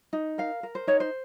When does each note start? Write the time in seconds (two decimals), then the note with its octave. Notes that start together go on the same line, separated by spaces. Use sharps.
0.13 D#4
0.38 A#4 F5
0.63 A#4
0.75 C5
0.87 D#4 C#5
1.00 C5